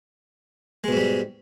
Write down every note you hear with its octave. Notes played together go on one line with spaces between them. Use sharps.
G#2 B2 G3 G#3